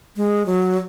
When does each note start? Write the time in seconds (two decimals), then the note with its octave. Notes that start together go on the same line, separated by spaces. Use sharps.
0.16 G#3
0.46 F#3